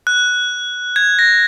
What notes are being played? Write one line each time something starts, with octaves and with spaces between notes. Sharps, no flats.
F#6
G#6
A#6